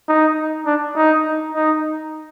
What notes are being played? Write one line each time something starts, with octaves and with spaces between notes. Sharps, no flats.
D#4
D4
D#4
D#4